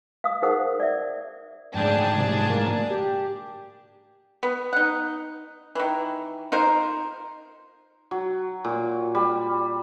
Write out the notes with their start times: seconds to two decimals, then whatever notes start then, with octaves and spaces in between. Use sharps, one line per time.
0.24 F5 D#6
0.42 D#4 G#4 A#4 C5 F#5 D#6
0.80 D5 E5
1.75 D2 G#2 D4 G#4 G5 A5
2.17 C3
2.49 A#3
2.90 G4
4.43 B3
4.73 D#4 F#5
5.75 D#3 E3
6.52 D#4 F4 A#4 C5
8.11 F#3
8.64 A#2
9.15 G3